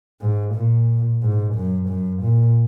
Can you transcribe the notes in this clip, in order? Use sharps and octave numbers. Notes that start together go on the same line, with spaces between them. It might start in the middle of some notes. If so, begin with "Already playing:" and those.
G#2
A#2
G#2
F#2
F#2
A#2